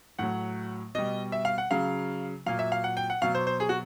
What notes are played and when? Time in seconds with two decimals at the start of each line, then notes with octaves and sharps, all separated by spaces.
0.19 A2 F#3 F#5
0.95 B2 G3 D#5
1.32 E5
1.45 F5
1.58 F#5
1.71 C#3 F#3 F5
2.46 A#2 F#3 F5
2.59 E5
2.72 F5
2.84 F#5
2.97 G5
3.10 F#5
3.22 B2 F#3 F5
3.35 C5
3.47 C5
3.60 G#4
3.69 F#4